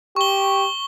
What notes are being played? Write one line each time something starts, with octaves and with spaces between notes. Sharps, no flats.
G4 C#6 G7